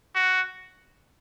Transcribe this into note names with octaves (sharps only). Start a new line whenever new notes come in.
F#4